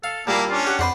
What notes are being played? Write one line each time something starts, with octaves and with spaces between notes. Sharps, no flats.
A4 F5
A#2 G3 A#3 E4 A5
C#4 D4 F4
G4 F#5
F2 B4 C5 D5 F#5